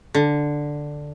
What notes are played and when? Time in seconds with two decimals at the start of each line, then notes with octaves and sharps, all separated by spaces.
0.15 D3